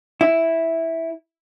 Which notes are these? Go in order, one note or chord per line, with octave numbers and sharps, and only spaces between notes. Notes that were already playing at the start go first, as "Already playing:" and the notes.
E4